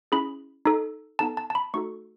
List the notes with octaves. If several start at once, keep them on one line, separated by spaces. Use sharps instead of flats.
C#4 E4 G#4 B5
D#4 A4
B3 D#4 A4 A5
A5
A5
B5
A3 D#4 F#4 A4 C#6